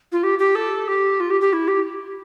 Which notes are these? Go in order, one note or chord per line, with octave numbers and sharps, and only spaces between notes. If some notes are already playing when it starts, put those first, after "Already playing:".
F4
G4
G4
A4
G4
F4
G4
G4
E4
G4